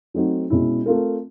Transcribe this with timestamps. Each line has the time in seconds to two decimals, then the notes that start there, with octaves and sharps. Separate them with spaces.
0.14 F#3 A3 C4 D#4 F#4
0.50 B2 G#3 C#4 E4
0.86 A3 C4 F4 A#4